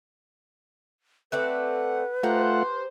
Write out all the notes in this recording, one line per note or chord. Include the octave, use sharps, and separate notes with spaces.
A3 C4 B4 D5 F#5
A3 F4 G4 C5 F#5 A#5